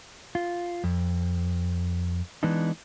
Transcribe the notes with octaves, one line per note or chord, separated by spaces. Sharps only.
F4
F2
E3 G#3 B3 D4 D#4